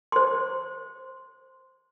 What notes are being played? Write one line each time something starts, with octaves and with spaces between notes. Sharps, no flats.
C5 C6